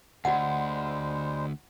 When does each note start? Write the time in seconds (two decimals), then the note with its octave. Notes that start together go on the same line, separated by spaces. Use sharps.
0.25 D2 G3 G#3 F#4 C5 F#5